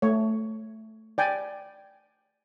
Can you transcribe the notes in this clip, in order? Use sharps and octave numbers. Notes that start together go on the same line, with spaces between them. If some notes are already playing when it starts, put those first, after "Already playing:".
A3 C#5
D5 G5 G#5